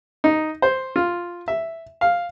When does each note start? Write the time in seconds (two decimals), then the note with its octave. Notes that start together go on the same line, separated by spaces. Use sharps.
0.24 D#4
0.62 C5
0.96 F4
1.48 E5
2.01 F5